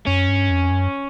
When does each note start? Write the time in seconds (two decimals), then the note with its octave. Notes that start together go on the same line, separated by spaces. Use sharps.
0.06 F#2 C#4
0.28 G2
0.50 F2
0.71 F#2